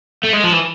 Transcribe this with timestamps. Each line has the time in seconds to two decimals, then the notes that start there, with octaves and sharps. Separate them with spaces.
0.25 A3
0.34 G#3
0.45 F3
0.54 E3